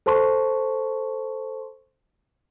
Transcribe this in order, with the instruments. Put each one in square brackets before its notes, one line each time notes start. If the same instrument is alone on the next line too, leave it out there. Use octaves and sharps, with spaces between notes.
[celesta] A4 C5 A5 C6 C#6